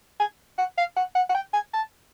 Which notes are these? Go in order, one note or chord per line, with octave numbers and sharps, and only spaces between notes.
G#5
F#5
F5
F#5
F#5
F#5
G5
G#5
A5